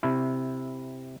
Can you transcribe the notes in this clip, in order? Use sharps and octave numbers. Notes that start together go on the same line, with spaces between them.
C3 E4